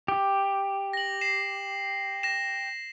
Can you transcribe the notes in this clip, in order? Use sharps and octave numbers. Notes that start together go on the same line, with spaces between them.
G4
A#6 F#7
C7 E7
A#6 E7